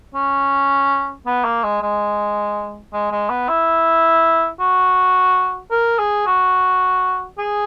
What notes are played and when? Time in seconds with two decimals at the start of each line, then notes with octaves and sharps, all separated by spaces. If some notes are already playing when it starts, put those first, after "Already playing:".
0.15 C#4
1.26 B3
1.44 A#3
1.63 G#3
1.82 G#3
2.93 G#3
3.12 G#3
3.30 B3
3.49 E4
4.60 F#4
5.71 A#4
5.99 G#4
6.26 F#4
7.38 G#4